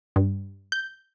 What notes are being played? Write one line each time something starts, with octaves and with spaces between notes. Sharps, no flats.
G2
G6